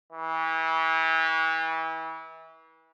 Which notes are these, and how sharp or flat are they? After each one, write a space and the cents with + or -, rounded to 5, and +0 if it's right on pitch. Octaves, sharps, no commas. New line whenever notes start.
E3 -30